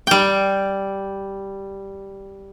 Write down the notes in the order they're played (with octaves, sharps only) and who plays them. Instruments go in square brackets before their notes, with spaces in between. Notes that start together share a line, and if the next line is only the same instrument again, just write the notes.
[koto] G3 G5